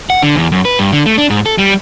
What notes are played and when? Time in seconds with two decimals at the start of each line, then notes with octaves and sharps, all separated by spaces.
0.10 F#5
0.23 D3
0.36 E2
0.52 F#2
0.65 B4
0.79 G2
0.92 D3
1.06 A3
1.18 D4
1.30 G#2
1.46 A4
1.58 G3